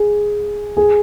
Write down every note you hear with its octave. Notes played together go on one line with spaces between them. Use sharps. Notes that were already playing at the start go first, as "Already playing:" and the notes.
Already playing: G#4
G#4